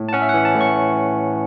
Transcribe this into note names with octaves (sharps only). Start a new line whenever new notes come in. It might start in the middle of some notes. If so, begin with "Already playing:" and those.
Already playing: A2
A5
C#4 F#5
E5
E3 F#5
A5
A2
C#6